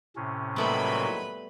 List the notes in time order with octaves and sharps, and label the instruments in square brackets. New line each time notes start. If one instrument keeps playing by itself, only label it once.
[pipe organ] A2 C3 C#4
[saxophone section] A#2 D#3 F#3 [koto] G3 A3 B3 [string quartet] B4 B5